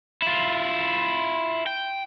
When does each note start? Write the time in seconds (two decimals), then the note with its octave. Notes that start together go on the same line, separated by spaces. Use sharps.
0.22 E4 F4
1.66 G5